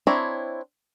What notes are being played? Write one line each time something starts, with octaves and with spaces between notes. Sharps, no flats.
C4 D4 E4 C#5 A#5